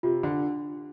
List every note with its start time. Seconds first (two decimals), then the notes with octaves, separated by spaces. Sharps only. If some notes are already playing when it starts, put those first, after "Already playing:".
0.03 C3 F4
0.23 D3 D4